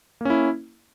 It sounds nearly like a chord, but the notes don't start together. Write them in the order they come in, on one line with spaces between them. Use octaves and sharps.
A#3 C#4 E4